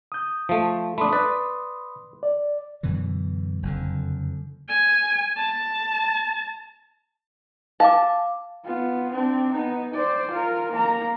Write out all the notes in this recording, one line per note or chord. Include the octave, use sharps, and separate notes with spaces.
D#6 G6
F3 A3
A3 D4 B5 C6 D#6
B4 D5
D5
F#2 B2 D3 E3
F#1 F2 D3
G#5
A5
F5 A5 D6
B3 F4
C4 D4
B3 D#4
C5 D5
F4 A#4
A#3 A#5